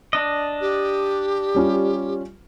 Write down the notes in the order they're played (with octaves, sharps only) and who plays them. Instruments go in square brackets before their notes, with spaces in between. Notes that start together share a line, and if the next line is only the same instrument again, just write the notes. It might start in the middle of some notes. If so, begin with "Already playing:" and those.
[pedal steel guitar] D4 D#5
[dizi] G4
[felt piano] G3 C#4 F4